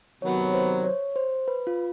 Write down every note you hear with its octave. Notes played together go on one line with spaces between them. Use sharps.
C3 D#3 F#3 B3 C#5
C5
C#5
C5
B4
F4